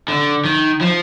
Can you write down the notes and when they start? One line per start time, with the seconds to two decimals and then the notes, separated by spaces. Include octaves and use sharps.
0.08 D3
0.45 D#3
0.81 F3